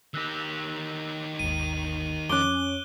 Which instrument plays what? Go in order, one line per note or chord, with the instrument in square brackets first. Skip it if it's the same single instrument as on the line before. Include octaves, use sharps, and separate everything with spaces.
[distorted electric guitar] D#3 G4 [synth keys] E6 F#6 A#6
[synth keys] G#1 D#2 [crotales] D#7
[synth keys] F2 C#4 [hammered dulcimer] D6 [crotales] F#6 G7